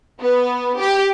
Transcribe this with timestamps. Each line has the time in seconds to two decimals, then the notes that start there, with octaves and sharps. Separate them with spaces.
0.20 B3
0.79 G4